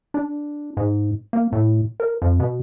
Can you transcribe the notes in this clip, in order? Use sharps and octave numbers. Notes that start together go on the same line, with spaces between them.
D4
G#2
A#3
A2
A#4
F2
B2